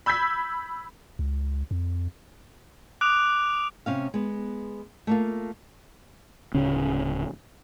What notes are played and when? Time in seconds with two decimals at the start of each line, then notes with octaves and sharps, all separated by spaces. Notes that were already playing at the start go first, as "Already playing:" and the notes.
0.06 B5 E6 G6 G#6 B6
1.19 C#2
1.71 F2
3.01 D6 D#6 F#6 D7 F7
3.86 C3 C#4 F5
4.14 G#3 B3
5.07 A3 A#3 F4
6.54 D1 C#3 C#4